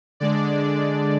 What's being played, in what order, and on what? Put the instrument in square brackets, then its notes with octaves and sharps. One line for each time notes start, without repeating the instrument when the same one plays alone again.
[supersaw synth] D3 G#3 D4 D5